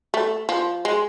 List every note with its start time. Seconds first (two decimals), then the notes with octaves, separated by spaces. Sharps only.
0.14 A3
0.49 F3
0.85 G#3